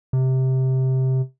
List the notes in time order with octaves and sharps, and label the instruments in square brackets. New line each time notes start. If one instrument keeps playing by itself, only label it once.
[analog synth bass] C3